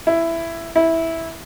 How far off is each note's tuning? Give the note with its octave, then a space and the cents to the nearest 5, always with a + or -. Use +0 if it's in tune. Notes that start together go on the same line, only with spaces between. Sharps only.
E4 +10
E4 -10